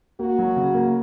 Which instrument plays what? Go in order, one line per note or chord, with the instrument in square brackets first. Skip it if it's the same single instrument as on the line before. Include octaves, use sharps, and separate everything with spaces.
[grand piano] A#3 [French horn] F#4
[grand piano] F#3
C#3
A#3